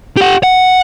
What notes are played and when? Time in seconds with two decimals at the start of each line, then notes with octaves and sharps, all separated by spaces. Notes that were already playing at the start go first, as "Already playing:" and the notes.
0.17 G4 F#5
0.43 F#5